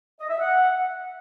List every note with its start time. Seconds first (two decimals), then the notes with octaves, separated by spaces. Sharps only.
0.20 D#5
0.30 E5
0.40 F#5